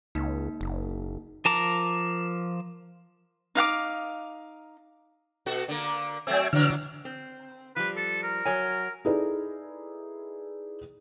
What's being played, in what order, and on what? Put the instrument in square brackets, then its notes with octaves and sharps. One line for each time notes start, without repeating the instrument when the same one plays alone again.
[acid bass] C#2 [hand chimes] A#3 D#4
[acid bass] F#1
[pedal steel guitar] F3 A#4 A5 A#5 D6
[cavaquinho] D#4 F5 F#5 D6
[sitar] B2 F#4 A4
D3 A#3
[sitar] F#3 A3 C4 [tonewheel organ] E5 G#5
[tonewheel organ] D3 F6 [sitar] E3 F#3 D4
[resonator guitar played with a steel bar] C4
[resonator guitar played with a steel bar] F3 G3 [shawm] B4
[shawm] A4
A#4
[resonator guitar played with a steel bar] F#3 C#5 G#5
[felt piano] D#4 E4 G#4 A4 B4 D5